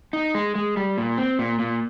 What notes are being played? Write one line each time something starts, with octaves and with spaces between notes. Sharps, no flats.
D#4
G#3
G#3
G3
A#2
C4
A#2
A#2